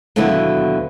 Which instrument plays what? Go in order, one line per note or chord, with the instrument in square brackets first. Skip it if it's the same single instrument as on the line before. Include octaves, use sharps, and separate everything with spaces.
[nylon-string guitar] D#2 B2 D3 F#3 B3 E4